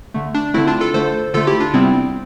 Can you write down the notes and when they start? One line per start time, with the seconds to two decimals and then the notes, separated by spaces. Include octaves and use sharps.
0.14 D3 A3
0.34 D4
0.54 D3 A3 C4 E4
0.67 D4 F4
0.80 F4 A4
0.94 D3 A3 A4 C5
1.34 D3 A3 F4 A4
1.47 E4 G4
1.60 D4 F4
1.73 C3 G3 B3 C4 E4
1.93 C4